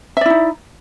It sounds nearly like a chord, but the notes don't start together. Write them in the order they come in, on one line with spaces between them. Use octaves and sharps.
E5 D5 E4 D#4